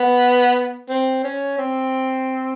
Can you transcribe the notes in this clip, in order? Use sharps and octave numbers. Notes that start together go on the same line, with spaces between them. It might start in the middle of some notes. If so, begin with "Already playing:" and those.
Already playing: B3
C4
C#4
C4